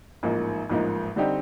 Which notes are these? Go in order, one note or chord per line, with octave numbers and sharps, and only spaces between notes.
A1 G#2 F3 A#3 D#4
A1 G#2 F3 A#3 D#4
D3 G3 C4 D#4 G4